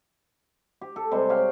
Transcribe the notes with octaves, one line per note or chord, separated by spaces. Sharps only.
G4
A4
C3 G3 G#3
G4 C#5 F5 G5